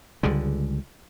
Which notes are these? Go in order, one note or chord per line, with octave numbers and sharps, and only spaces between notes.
C#2 D3 G3 G#3